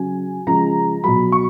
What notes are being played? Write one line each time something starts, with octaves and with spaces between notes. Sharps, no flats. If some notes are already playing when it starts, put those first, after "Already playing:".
Already playing: C#3 F#3 G#5
C#3 F3 G#3 A#5
B2 F#3 B5
C#6